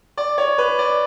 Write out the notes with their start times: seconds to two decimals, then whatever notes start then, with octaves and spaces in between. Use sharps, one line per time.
0.17 D5
0.38 C#5
0.58 B4
0.79 D5